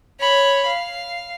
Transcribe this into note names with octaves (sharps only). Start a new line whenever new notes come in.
C#5 B5
F5